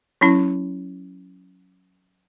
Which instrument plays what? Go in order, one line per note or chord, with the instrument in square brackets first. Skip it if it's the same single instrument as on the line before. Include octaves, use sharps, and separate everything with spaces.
[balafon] F#3 C#4 E4